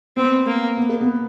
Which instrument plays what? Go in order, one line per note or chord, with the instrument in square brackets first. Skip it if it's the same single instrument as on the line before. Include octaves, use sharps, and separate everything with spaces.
[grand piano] B3 [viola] C4
[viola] A#3
[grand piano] B3
A#3
B3